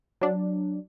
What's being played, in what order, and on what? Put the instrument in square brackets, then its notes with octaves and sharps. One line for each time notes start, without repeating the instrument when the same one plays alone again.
[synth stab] F#3 D4